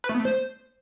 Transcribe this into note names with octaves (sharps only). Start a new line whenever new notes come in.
B4
A3
B3
A3
C5